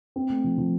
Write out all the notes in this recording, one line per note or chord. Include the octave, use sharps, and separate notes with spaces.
C4
A3
F3
F3